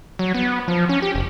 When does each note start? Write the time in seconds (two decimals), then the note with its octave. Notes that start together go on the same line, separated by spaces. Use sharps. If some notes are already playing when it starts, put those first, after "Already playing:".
0.19 F#3
0.34 B3
0.68 F3
0.89 C#4
1.02 G4
1.15 F1